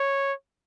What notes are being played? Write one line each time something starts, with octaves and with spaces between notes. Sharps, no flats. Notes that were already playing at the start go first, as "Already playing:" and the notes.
Already playing: C#5